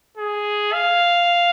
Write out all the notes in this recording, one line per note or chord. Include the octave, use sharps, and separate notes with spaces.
G#4
F5